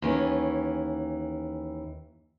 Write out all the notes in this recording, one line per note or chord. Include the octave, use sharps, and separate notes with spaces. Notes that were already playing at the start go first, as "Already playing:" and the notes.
D#2 E3 C#4